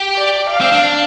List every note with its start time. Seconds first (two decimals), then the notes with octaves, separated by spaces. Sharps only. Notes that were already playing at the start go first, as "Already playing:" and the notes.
Already playing: G4
0.16 D5
0.50 F5
0.60 C4
0.72 D4